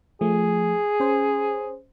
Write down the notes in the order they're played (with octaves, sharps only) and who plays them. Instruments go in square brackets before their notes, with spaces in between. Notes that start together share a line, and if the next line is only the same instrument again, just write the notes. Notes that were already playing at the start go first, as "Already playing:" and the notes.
[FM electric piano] F3 A3 [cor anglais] G#4
[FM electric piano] C#4 C5